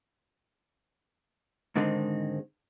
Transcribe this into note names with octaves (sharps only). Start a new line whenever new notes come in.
G#2 D3 D#3 G#3 C4